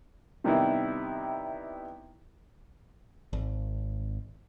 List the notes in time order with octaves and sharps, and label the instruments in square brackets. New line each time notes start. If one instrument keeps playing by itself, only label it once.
[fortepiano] C3 D#3 G3 B3 D#4 E4
[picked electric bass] G#1